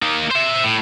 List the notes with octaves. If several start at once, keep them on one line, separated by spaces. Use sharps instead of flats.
A#3 D#4
C5 E5
A2